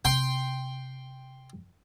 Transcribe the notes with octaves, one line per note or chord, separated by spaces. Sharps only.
C3 G5 C6